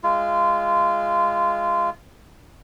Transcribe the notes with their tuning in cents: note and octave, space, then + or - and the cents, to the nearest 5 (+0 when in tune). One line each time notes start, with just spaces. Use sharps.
G#3 -10 F4 -20